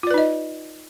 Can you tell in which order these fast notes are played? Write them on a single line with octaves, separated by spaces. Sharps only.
F4 D5 B4 D#4 D#5